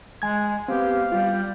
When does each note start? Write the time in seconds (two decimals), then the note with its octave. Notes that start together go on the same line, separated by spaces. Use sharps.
0.22 G#3 G#5 G#6
0.68 B3 C4 G4 F5
1.12 G3 F4